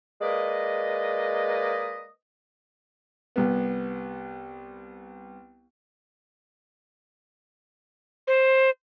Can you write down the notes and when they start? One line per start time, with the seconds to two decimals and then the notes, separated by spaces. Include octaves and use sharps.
0.22 G#3 A#3 B4 D5 D#5
3.36 C2 B3
8.27 C5